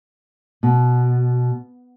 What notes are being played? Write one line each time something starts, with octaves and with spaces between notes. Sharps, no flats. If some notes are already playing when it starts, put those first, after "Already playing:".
B2